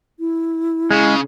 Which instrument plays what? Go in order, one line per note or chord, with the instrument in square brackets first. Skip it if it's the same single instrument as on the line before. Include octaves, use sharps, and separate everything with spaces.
[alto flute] E4
[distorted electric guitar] C#3 [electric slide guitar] G#3